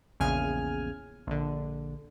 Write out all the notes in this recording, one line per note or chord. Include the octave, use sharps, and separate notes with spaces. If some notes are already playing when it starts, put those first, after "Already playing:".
A#1 E2 C#3 G#5 F6
A#1 D3